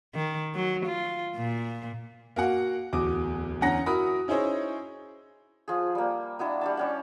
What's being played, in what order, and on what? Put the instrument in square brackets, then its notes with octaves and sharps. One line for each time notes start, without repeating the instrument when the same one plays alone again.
[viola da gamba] D#3
F#3
F4
A#2
[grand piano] A#3 F#4 F#5
D1 E2 F#4 D6 D#6
E2 D3 C#4 F#5 A#5 A#6
E4 F#4 A#4 B5 D#6
C#4 D#4 E4 G#4 C5 C#5
[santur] F3 G#4
G3 A#3
D4 E4 F#4 D#5
G3 D4 A5
G3 C#4 F#5